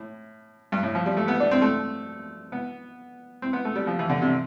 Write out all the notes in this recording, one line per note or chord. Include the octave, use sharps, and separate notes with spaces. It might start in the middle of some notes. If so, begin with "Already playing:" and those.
Already playing: A2
G2
A2
F3
G3
A3
B3
D4
C4
A3
B3
C4
B3
A3
G3
F3
E3
D3
C3